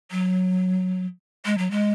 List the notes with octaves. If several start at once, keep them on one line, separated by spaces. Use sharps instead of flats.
F#3
G#3
F#3
G#3